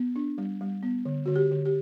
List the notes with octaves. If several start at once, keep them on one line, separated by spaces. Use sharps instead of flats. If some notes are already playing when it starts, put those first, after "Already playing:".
Already playing: B3
D4
G3
G3
B3
D3
D3 F#4
G4
D3
G4